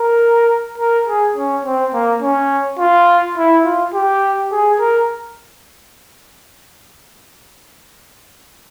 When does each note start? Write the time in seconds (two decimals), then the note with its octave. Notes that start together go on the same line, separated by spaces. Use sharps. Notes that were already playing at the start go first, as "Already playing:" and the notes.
Already playing: A#4
0.78 A#4
1.08 G#4
1.36 C#4
1.65 C4
1.93 A#3
2.22 C#4
2.79 F4
3.37 E4
3.65 F4
3.94 G4
4.52 G#4
4.80 A#4